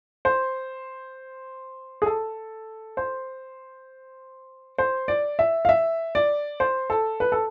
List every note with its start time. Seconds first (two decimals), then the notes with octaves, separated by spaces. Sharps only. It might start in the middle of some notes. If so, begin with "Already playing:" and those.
0.25 C5
2.02 G#4
2.06 A4
2.97 C5
4.78 C5
5.08 D5
5.39 E5
5.65 F5
5.69 E5
6.15 D5
6.60 C5
6.90 A4
7.20 B4
7.32 A4